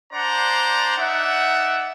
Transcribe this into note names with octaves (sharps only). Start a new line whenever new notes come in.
D4 C5 D5 F#5 A#5 C6
D#4 D5 E5 F#5